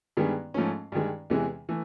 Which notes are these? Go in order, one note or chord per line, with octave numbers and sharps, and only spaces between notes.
G2 D#3 G#3 B3
G#2 F3 A3 C#4
G2 D#3 G#3
E2 C3 E3 G#3
E3 A3